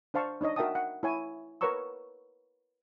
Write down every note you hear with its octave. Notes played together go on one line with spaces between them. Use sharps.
D4 C5 F5 A5 C#6
D4 D#4 C#5 D#5
F#4 A#4 E5 G5 A5 D#6
F#5
E4 C#5 G#5
A#4 B4 C#5 A#5 C#6 E6